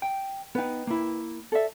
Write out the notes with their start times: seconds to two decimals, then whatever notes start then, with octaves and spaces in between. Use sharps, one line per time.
0.02 G5
0.55 B3 D#4 B4 G5
0.87 A#3 E4
1.52 A4 D5 E5